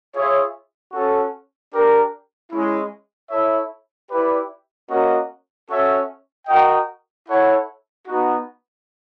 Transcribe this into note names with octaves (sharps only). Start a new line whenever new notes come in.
F4 G#4 C#5 E5
C#4 F#4 A4
D4 G4 A#4
G#3 C#4 E4
E4 A4 C#5 E5
E4 G4 B4 D5
A#3 C#4 F#4 A#4 D#5
C#4 F#4 A4 C#5 E5
F#4 A#4 D#5 G5
E4 A4 C#5 F#5
B3 D#4 F#4